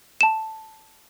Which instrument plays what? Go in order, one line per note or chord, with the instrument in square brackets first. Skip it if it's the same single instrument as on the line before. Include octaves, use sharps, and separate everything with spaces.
[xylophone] A5 E7